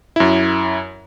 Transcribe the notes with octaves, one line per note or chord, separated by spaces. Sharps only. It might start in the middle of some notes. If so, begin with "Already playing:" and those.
F#2 E4